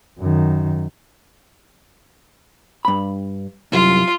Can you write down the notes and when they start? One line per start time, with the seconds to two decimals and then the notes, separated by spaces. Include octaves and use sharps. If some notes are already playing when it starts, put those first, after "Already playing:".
0.19 F#2 D#3
2.85 G2 B5
3.72 C2 F#2 F4